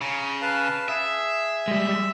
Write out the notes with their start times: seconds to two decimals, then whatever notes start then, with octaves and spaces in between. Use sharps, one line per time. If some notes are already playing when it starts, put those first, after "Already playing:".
0.01 C#3 A#5
0.42 B4 F5 A5
0.88 G#4 E5
1.68 G3 G#3